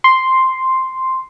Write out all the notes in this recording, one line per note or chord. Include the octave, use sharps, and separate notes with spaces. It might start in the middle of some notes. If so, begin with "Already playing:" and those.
C6